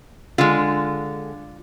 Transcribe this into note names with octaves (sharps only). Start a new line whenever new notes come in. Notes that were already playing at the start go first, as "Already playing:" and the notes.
D3 G#3 F4